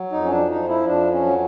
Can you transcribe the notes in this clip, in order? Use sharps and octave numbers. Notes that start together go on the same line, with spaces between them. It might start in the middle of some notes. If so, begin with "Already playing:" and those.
Already playing: F#3
F2 D#4
C#4
D4
F3 D#4
E4
F2 D4
C#4
F#3